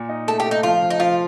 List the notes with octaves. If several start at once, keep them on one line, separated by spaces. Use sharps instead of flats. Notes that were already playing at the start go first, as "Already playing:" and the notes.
Already playing: A#2
D#4
A3 A4
G4
A3
D#4
F3 F4
F3
D#4
F3 F4